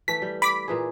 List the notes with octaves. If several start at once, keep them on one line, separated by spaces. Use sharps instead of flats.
E3 A3 B6
G3
B5 D6 B6
A#2 E3 G#4